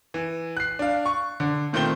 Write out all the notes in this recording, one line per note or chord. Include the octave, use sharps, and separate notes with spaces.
E3
F#6 C7
D4 F5
C#6
D3
A#2 D#3 A3 C4 G6 G7